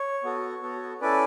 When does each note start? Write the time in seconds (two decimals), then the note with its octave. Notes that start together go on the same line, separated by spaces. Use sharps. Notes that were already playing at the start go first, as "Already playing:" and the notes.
Already playing: C#5
0.24 B3 F#4 A4
0.62 B3 F#4 A4
1.01 C#4 E4 A4 B4 D5